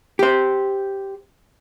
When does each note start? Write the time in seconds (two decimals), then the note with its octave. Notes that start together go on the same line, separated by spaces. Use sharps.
0.19 G4 C5